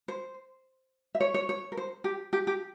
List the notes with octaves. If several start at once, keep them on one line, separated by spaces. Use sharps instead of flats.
C5
E5
C#5
C#5
C#5
A#4
C5
G4
G4
G4